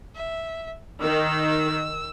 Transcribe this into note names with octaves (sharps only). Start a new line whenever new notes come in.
E5
D#3 E6